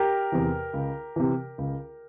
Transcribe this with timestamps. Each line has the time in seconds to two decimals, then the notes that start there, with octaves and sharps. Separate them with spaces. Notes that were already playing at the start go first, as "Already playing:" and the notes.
Already playing: G4 A#4
0.32 E2 C3 E3
0.74 C#2
1.16 C3 E3
1.58 C#2